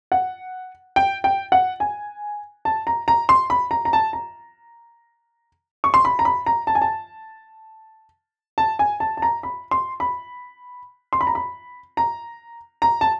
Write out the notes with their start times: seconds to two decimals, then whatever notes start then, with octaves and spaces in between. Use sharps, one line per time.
0.12 F#5
0.96 G5
1.24 G5
1.52 F#5
1.80 G#5
2.65 A5
2.87 A#5
3.08 A#5
3.29 C6
3.50 B5
3.71 A#5
3.85 A#5
3.93 A5
4.13 A#5
5.84 C#6
5.94 C6
6.05 B5
6.19 A#5
6.25 B5
6.46 A#5
6.67 A5
6.75 G#5
6.82 A5
8.58 A5
8.79 G#5
9.00 A5
9.17 A5
9.22 A#5
9.43 B5
9.71 C6
10.00 B5
11.13 C6
11.21 B5
11.27 A#5
11.35 B5
11.97 A#5
12.82 A#5
13.01 A5